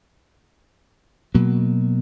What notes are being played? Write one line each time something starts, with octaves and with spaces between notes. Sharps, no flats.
B2 F#3 A#3